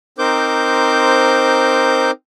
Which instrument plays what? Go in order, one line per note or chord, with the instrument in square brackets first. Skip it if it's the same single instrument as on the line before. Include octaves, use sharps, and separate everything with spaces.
[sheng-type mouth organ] C4 D#4 A#4 C5 D6 G6